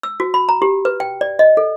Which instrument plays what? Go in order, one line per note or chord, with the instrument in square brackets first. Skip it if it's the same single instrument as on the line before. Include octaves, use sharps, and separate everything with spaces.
[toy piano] E6
F#4
B5
A#5
G4
B4
G5
D5
D#5
A4